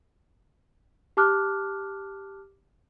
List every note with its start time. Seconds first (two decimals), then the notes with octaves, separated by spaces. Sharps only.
1.17 G4 A5 D6 F6 F#6